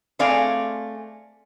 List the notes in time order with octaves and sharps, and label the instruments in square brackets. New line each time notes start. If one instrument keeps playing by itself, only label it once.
[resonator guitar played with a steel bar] A3 C4 G#4 D5 F5 G#5